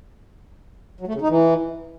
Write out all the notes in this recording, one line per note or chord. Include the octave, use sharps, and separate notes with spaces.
F#3
A3
C#3
D#4
E3